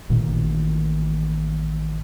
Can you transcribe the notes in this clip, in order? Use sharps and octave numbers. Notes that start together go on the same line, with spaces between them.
A1 A#2 D#3